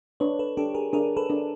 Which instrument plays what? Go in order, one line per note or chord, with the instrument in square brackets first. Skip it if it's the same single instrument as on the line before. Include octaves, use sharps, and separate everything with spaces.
[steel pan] D4 [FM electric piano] B4 C#5
[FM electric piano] A4 B4
[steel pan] D4 [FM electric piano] G4 A4
[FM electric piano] G#4 A#4
[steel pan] D4 [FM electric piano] G#4 A#4
[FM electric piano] A4 B4
[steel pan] D4